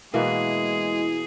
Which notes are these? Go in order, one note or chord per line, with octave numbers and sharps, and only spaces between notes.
B2 E3 G#3 A#3 E4 G#4